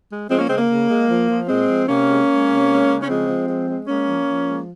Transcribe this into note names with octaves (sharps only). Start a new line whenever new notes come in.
G#3
F3 G#3 C4
A#3 C#4
C#3 G#3 C4
A#3
C#3
G#3
F3
F3
A#2 G#3 C4
F3
C3 A#3 C#4
G#3
G#3
C3
G#3
C#3
C#4
F3 G#3 C4
F3
G#3
G#3
G#3 A#3 C#4
F3
F3
G#3